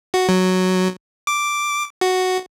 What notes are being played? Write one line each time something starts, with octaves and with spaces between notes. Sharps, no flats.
F#4
F#3
D6
F#4